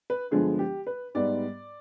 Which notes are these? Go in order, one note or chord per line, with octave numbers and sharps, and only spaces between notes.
B4
G2 D3 F3 G#3 B3 G#4
G4
B4
G#2 G3 B3 D5